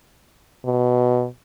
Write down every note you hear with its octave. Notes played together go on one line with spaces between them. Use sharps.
B2